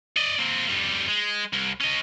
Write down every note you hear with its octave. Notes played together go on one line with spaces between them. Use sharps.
D5 D#5
A#3 C4
F2 G3
G#3
C2
C#4 D#5